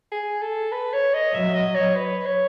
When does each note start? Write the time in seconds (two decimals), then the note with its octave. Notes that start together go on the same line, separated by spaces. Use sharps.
0.12 G#4
0.42 A4
0.72 B4
0.93 C#5
1.14 D#5
1.34 F#3 E5
1.54 D#5
1.75 C#5
1.95 B4
2.26 C#5